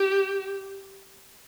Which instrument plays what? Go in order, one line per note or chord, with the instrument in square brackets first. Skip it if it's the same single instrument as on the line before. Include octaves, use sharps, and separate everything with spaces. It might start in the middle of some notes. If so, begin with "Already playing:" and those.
Already playing: [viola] G4